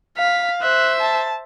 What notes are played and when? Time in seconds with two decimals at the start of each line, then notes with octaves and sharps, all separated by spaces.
0.18 F5 B6
0.62 C5 E5 F#6
1.01 A5